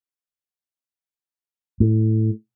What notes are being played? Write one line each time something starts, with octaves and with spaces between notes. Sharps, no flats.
A2